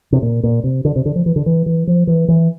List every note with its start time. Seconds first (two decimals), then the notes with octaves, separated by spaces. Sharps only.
0.12 C3
0.22 A#2
0.43 A#2
0.64 C3
0.85 D3
0.96 C3
1.05 D3
1.16 F3
1.26 E3
1.36 D3
1.46 E3
1.66 E3
1.87 F3
2.07 E3
2.28 E3